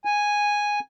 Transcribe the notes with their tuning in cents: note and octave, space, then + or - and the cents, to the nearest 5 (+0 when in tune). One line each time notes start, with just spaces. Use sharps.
G#5 -5